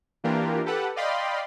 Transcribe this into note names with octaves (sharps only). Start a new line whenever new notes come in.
E3 A#3 D4 F4 G4 A#4
G4 A4 B4 F#5
D5 D#5 F5 G5 B5 C6